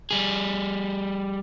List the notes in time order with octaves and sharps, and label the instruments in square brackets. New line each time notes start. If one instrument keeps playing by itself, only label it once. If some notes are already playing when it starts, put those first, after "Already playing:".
[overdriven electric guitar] G3 G#4